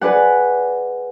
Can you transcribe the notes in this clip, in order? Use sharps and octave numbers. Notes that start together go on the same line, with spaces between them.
G#4 B4 D5 F#5